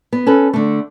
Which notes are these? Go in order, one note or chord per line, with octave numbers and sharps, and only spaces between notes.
B3
C#4 A4 B4
D3 A3